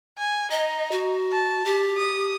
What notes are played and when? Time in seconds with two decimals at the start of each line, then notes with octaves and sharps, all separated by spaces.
0.18 G#5
0.51 D#4 D#5
0.92 F#4
1.32 A5
1.65 G4
1.97 D#6